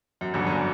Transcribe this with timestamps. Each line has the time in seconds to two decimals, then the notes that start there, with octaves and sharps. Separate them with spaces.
0.21 F#2
0.34 G1 G2
0.47 F#2